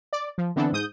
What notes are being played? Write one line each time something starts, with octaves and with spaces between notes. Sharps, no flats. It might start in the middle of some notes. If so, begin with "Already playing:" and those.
D5
F3
D3 E3 B3 C4 D4 A4
G#2 D#6 G6